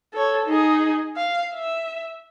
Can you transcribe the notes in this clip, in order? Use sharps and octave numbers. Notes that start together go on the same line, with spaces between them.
A4 C#5
D#4 G#4
F5
E5